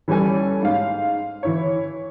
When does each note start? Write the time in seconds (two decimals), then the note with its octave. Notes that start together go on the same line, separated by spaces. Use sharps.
0.08 E3 G3 C#4 A4 G#5
0.62 G#2 F5
1.43 E3 E4 C#5